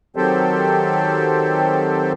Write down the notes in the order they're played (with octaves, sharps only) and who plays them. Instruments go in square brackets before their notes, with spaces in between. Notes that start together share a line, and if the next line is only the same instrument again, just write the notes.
[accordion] D#3 F#3 C4 G4 A4 C5